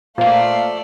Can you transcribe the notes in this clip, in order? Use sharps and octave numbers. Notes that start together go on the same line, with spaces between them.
A#2 A3 A#3 F4 C5 D5 F5